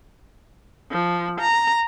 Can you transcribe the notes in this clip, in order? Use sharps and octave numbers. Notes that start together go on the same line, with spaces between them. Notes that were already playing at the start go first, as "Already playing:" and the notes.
F3
A#5